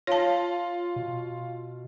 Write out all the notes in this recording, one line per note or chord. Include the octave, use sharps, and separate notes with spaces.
F4 C#5 F5 A5
B2